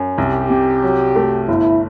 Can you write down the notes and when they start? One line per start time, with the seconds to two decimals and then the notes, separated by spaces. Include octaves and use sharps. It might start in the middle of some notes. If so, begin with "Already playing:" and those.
Already playing: F#2
0.18 C2 G4
0.50 C3
0.83 F#3
1.16 A3
1.48 G1 E4